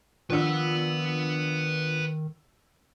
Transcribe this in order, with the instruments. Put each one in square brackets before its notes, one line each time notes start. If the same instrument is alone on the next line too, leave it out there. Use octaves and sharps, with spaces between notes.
[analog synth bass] D#3 [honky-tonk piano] F3 D4 E6 [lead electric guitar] B4 F#5